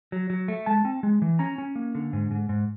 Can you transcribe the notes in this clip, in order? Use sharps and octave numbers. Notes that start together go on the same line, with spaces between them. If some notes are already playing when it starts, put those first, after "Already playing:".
F#3
F#3
A3
G#3 A5
C4
G#3
E3
C#4 A#5
C#4
A#3
D3
G#2
G#2
G#2